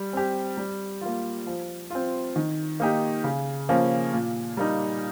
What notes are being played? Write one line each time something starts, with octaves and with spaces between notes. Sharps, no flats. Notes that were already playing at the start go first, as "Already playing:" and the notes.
Already playing: G3
C4 G4
G3
A#3 F4
F3
C4 F4
D#3
A#3 D#4 G4
C#3
F3 A#3 C#4
A#2
G3 A#3 D#4